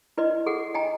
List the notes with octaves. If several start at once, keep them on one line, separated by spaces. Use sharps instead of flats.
E4 B4 D5 D#5
G#4 A4 F#5
D#5 G5 G#5 A#5